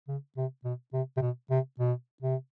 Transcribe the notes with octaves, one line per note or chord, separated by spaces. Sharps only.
C#3
C3
B2
C3
C3
B2
C3
B2
C3